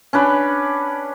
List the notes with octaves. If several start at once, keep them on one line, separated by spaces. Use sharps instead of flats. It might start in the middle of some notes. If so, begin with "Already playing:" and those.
C#4 D4 B4 B5